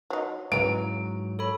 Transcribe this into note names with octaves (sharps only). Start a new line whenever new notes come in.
F#3 D#4
G#2 C#3 E3 F#3 A#5 D7
A4 C#5 B5